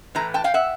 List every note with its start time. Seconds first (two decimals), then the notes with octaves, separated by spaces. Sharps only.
0.15 A2 E3 A3 A#5
0.34 G5 A5
0.44 F5 G5
0.54 E5 F#5